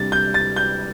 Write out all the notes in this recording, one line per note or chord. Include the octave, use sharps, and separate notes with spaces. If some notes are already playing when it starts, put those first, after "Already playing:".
Already playing: C3 G3 D4 A6
G6
A6
G6